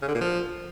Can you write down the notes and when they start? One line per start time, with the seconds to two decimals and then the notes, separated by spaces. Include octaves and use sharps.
0.02 C#3
0.08 D3
0.15 A#2
0.21 F3